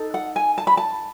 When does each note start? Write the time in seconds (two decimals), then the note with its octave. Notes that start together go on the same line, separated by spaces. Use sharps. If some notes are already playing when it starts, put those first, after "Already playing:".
Already playing: D#4 A4
0.14 F#5
0.36 G#5
0.58 A5
0.67 B5
0.77 A5